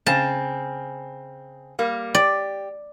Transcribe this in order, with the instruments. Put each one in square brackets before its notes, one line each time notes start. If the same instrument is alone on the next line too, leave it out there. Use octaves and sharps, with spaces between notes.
[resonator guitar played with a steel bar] C#3 C4 [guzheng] A5
[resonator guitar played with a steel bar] G3 A#3
[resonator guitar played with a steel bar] G4 [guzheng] D5